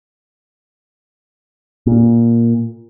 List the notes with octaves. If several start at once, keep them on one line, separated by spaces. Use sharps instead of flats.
A#2